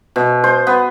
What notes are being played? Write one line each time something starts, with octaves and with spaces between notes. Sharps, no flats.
B2
C5
B3